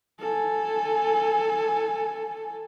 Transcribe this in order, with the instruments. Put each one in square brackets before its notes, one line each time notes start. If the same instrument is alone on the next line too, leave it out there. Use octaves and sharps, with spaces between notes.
[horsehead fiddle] A4 G#5